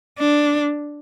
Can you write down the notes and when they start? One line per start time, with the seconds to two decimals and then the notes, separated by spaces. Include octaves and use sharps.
0.19 D4